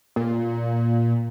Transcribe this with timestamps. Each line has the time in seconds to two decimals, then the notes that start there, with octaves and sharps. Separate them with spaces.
0.16 A#2